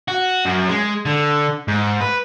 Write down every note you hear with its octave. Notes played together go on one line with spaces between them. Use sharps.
F#4
F#2
G#3
D3
G#2
B4